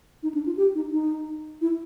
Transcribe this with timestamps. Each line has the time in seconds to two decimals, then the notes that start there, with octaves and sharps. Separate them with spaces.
0.23 D#4
0.34 D4
0.46 F4
0.57 G4
0.75 D#4
0.92 D#4
1.61 E4